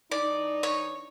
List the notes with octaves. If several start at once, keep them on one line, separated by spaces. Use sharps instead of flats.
E3 D4 D#4 D5
C#5